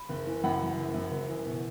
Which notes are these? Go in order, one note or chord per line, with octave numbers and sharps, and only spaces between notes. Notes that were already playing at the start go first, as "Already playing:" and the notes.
Already playing: B5
F#1
E3
F#2 F#5 B5
E3
F#1
F#2
F#1
E3
B2